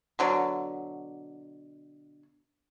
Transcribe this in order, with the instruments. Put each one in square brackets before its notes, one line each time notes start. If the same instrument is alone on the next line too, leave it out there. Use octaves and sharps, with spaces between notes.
[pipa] B2 D3 F#3